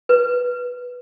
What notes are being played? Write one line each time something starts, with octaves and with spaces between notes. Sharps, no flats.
B4